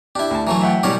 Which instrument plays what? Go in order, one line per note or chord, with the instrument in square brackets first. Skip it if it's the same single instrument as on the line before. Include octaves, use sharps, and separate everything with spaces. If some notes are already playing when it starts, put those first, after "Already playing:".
[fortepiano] D4 [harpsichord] E4 G4
[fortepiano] D2 A5
[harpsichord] E3 F#3 A3 [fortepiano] A#5
[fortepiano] E5 F#5 G5
[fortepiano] B2 E3 G3 [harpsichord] G4 A#4 C#5